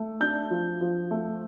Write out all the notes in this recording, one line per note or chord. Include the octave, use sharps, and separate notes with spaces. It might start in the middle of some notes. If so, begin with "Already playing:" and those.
Already playing: A3
D4 G6
F3
F3
A3